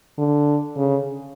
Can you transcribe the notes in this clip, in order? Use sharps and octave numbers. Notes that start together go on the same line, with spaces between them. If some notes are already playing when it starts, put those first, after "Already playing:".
D3
C#3